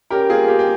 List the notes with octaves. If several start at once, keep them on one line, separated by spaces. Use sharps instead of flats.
C#4 G4 A#4
A#3 F4 G#4
A#3 G4
G4